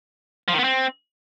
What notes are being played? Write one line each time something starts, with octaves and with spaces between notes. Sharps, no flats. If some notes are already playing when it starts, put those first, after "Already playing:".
F3
D#3
B3
C4